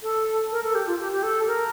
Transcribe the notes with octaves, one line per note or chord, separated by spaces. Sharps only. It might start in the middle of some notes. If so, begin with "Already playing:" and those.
A4
A#4
A4
G4
F4
G4
G4
A4
A#4